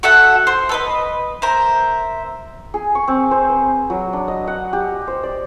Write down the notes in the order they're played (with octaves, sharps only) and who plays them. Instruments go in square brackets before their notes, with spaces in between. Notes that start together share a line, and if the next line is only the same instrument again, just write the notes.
[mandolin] F#4 A4 E5 F#5
C5
A4 B4 D#5
A#4 C5 E5
[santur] G#4
C#6
C4
C5
B4
F#3
D4
D#5
F#5
G4
C5
D5